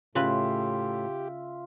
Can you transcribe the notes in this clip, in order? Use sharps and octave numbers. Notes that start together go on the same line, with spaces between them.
A2 C#3 F4 G4 B4 E5